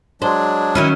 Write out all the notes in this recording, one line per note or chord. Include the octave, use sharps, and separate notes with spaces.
F#3 G#3 D4 C5
D#3 F#3 C#4 E4